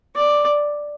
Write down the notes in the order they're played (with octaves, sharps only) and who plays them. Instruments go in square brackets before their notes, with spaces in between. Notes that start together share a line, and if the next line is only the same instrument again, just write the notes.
[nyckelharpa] D5